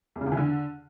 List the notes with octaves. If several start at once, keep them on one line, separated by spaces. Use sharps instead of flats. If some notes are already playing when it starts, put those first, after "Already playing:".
E2
C#3
E2
E3
D3